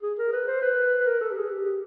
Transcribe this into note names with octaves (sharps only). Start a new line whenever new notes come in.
G#4
A#4
B4
C5
B4
B4
A#4
A4
G4
G#4
G4
G4